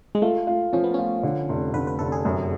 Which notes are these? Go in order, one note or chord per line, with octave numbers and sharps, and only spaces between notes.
G#3
A3 F4
F4
F3 C#4
B3
C#4 F4
D3
F1
D3 B4
B4
F1 A4
G#4
F#2